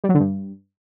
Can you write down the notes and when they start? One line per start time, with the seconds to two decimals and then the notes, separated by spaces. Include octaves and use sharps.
0.04 G3
0.09 F#3
0.14 D3
0.20 G2